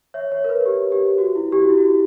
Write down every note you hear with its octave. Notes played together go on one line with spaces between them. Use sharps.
C#5 E5
C#5
A#4
B4
G4
G4
F#4
E4
G4
F#4
E4
F#4